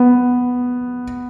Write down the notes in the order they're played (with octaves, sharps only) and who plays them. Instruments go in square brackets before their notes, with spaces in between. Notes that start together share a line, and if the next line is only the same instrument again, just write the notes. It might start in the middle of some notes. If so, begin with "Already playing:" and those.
Already playing: [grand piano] B3